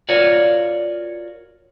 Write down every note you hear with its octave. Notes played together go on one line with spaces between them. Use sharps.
F4 F#4 A#4 C#5 D5